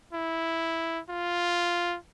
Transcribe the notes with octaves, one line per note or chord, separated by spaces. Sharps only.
E4
F4